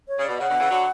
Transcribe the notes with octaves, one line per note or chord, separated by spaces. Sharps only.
C#5
C#3
B2 D5
C#3 F#5
B2 D3
C#3 E3
D3 F#3